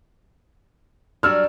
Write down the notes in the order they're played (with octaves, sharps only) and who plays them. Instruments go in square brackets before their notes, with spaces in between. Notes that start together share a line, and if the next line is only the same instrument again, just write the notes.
[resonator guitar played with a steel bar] F#3 G3 D4 [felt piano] E6 F6